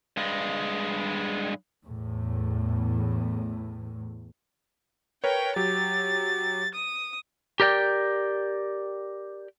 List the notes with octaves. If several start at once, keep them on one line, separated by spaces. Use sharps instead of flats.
G2 G#3
E2 A2
A#4 B4 C#5 G5
F#3 G4 A6
D#6
G4 A#4 D5 G5